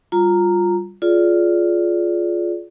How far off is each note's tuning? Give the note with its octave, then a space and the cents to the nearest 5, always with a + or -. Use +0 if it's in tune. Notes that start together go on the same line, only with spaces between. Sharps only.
G3 +0 F4 +10 A#5 -10
F4 +0 G#4 +30 D5 -15